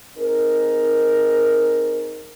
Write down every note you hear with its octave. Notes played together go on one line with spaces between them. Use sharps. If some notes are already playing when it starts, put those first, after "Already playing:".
C4 D#4 G#4 A#4